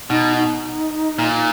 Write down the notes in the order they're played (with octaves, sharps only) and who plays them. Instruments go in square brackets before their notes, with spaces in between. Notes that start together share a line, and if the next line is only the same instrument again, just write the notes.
[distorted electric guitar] B2 [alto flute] D#4
[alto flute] D#4
[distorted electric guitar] A#2